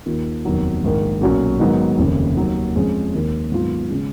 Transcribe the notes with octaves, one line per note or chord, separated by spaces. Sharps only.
D#2 D#3 A#3 F4
F1 D#2 D#3 F#3 B3
A#1 G#2 D#3 A#3
B1 A#2 F#3 C#4 F#4
G#2 D#3 F#3 B3 D#4
F1 D#2 C#3
D#2 D#3 F#3 A#3
F2 F3 G#3 C#4
D#2 D#3 A#3 D#4
G#2 D#3 F#3 B3 F4
C#3 G#3 C#4